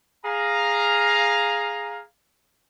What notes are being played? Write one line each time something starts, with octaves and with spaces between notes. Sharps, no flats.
G#4 F5 A#5